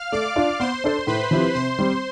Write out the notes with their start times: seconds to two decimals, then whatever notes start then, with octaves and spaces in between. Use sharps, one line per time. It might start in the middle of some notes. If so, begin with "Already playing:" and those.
Already playing: F5 F6
0.12 A3 D5 D6
0.36 D4 F4
0.60 B3 C5 C6
0.84 D4 A4 D5
1.07 A2 B4 B5
1.31 F3 C4 E4 G4
1.54 C3 C5 C6
1.79 G3 C4